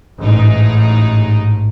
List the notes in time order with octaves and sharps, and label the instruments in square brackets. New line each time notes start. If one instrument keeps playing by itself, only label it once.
[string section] A1 G#2 D#4